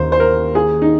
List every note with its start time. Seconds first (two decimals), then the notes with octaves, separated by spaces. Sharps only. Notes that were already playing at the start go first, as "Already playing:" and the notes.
Already playing: D#2 C5
0.12 C5
0.20 A#4
0.55 G#4
0.82 D#4